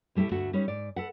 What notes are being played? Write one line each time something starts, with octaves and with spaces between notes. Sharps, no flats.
B2 G3 A3 E4 G4
D2 G2 A3 F#4 F#5
G3 C#4 D#4 B4 C#5
G#2 D5
A4 B4 F#5